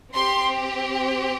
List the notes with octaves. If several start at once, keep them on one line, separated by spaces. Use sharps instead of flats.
C4 G4 C6